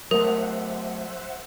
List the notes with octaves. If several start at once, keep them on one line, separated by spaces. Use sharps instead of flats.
F#3 A3 A#4 C5 E5 F#5